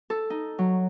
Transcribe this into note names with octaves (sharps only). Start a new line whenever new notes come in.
A4
D#4
F#3